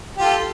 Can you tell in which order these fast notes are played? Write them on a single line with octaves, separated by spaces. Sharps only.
G4 F4 A4